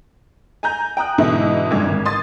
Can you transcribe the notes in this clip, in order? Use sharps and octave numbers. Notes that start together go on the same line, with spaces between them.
G#5 A#5 G6
G5 A#5 D#6 F#6
G#2 B2 D3 E3 G#3 E4
F1 G2 D3 G#3 D6 G#6
G#1
C6 D#6 A6